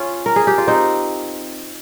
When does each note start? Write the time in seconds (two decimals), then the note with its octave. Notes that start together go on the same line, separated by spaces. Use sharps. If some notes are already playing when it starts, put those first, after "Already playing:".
Already playing: C#4 F4 G#4
0.26 A#4
0.36 G#4
0.47 G4
0.58 F4
0.68 C4 D#4